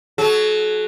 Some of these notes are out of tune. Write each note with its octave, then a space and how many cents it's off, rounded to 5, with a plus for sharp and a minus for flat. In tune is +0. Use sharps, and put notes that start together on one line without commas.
F#3 +0 A4 -45